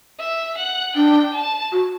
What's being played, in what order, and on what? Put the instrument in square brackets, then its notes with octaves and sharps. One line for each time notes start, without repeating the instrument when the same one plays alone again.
[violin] E5
F#5
[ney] D4 [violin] G5
[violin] A5
[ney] F#4